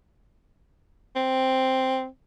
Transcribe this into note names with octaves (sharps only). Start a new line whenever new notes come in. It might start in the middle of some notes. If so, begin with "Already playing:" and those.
C4